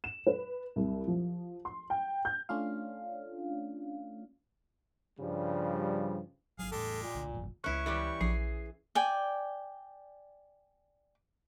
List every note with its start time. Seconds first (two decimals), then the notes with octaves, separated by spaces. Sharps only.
0.04 E7
0.27 B4
0.76 C2
1.08 F3
1.65 C6
1.90 G5
2.25 G6
2.49 A3 C#4 D4 F4 F5
5.20 G2 C#3 F3 G3
6.59 G#1 F#3 G#4 F5
6.72 E2 A2 G#3 G4 A4
7.03 A#2
7.14 C2 D3
7.34 G1 F2 A2
7.64 C#2 C#4 E4 C#6 F#6
7.86 E3 G3 G4
8.21 A#1 G#4 C7
8.95 D5 G5 G#5